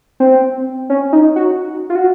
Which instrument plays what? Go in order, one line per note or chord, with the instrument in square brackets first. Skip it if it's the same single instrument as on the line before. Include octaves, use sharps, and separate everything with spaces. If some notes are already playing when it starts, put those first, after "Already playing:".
[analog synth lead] C4
C#4
D#4
F#4
F4
F#4